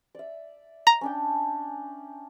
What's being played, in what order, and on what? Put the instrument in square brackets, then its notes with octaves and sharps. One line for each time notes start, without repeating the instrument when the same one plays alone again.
[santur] D5 E5
[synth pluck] A#5
[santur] C#4 D4 G5